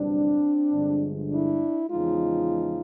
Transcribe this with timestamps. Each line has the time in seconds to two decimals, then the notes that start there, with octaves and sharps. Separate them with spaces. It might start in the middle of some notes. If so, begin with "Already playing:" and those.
Already playing: F#1 E2 B2 G3 C4 D4
0.72 G1 G2 D3 F3 G#3
1.31 D4 E4
1.90 E2 C#3 F3 G#3 D#4 F4